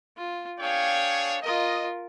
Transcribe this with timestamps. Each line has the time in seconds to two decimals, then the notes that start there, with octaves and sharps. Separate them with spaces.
0.17 F4
0.59 D4 G#4 C#5 F5 G5
1.42 F4 A#4 D#5